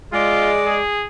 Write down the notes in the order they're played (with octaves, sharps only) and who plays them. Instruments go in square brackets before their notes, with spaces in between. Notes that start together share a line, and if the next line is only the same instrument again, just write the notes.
[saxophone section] G#3 D5 [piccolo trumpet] F4
[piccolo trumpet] G#4